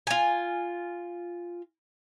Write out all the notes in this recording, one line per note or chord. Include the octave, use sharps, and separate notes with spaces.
F4 G#5